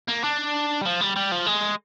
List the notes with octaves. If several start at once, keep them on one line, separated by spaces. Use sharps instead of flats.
A#3
D4
G3
F3
G3
G3
F3
G#3